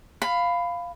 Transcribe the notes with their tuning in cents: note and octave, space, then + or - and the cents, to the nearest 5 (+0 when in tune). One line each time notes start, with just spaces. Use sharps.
F5 +0 B5 +15